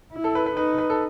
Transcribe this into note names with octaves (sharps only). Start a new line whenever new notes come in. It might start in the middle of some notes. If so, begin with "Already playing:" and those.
E4
A4
B4
B4
D#4 B4
B4
A4